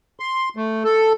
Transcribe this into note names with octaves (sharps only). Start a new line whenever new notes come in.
C6
A3
A4